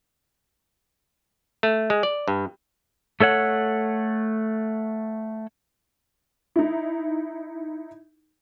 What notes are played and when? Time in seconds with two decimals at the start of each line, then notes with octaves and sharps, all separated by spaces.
1.63 A3
1.90 G#3
2.03 D5
2.28 G2
3.20 A3 A4 C#5 F#5
6.56 D#4 E4